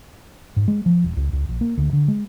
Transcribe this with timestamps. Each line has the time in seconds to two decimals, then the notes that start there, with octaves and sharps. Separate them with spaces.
0.56 G#2
0.68 G#3
0.86 F3
1.04 D#1
1.17 C#2
1.33 C#2
1.49 A#1
1.61 A#3
1.78 D2
1.93 D3
2.08 G#3